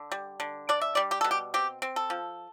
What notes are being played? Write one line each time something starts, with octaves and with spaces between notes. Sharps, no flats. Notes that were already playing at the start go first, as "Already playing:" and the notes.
Already playing: D3
G3
D3
D4 D5
E5
G3 D5
G4
B2 A4
G4
C4 G4
C4
A4
F3